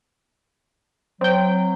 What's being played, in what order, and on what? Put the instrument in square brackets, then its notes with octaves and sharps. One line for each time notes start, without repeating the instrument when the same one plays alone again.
[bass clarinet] F#3 [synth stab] C4 G5